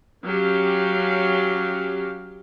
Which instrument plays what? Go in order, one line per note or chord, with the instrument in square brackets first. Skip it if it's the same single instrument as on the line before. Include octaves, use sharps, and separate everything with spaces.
[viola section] F#3 C#4 G4 F5